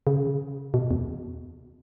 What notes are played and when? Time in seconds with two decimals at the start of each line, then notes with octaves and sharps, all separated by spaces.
0.07 C#3
0.74 B2
0.91 E2